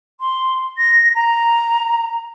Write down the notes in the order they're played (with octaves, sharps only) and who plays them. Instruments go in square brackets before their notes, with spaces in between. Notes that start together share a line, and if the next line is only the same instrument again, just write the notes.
[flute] C6
A#6
A#5